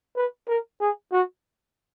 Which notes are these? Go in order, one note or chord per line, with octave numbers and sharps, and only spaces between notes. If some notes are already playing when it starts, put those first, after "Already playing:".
B4
A#4
G#4
F#4